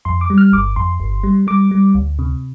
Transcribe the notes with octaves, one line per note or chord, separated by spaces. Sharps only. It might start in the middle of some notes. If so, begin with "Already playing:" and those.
F2 C6
D6
G3
F6
G1 D6
F2 C6
G1
G3
G3 D6
G3
D2
C3